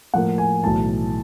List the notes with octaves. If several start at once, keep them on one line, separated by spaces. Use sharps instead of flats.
A2 F3 A#3 F#5
G#5
B1 A2 E3 A5